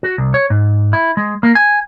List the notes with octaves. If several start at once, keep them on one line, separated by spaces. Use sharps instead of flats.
F#4
C2
C#5
G#2
E4
G#3
A#3
G#5